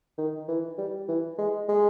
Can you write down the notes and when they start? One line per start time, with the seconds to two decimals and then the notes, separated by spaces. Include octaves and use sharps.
0.18 D#3
0.48 E3
0.78 G3
1.08 E3
1.38 G#3
1.69 G#3